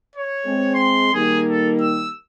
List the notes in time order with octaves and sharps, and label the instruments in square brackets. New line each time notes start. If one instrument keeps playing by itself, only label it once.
[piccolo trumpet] C#5
[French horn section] G#3 C4 G#4
[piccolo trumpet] C6
[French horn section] D#3 G3 A#3 [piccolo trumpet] G#4
[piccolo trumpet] A4
E6